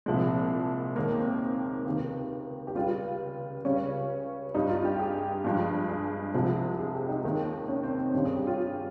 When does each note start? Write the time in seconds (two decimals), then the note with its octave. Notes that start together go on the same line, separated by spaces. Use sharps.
0.06 C2 A#2 F3 G#3
0.96 D#2 D#3 G#3 A#3
1.19 C4
1.85 C#2 C3 D#3
2.67 G4
2.75 C#2 C#3 G3 F4
3.65 C#2 C#3 G3 C#4
4.55 G2 G3 D#4
4.70 F4
4.85 G4
4.99 G#4
5.44 G2 F3 G#3
5.89 G#4
6.34 C2 C3 F3 G#3
6.79 G#4
6.95 G4
7.09 D#4
7.23 D#2 D#3 G#3
7.68 C#4
7.83 C4
7.99 C4
8.13 G2 D#3 G3 C#4
8.25 G#4
8.35 G4
8.47 F4